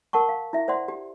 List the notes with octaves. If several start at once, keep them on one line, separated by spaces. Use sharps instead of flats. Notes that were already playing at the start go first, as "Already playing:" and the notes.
A#4 F#5 A5 C#6
F5
E4 E5
C5 D5 F#5 C6
G4